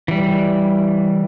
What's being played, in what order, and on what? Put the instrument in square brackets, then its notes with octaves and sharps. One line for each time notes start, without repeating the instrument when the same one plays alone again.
[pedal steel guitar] E3 G3